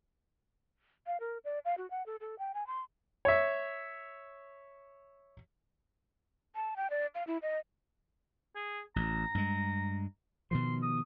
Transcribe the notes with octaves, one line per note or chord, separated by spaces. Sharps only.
F5
A#4
D5
F5
F#4
F#5
A4
A4
G5
G#5
C6
C#5 E5
A5
G5
D5
F5
E4
D#5
G#4
A1 A#5
G2 G#3
B2 D#3 F3 C6
D#6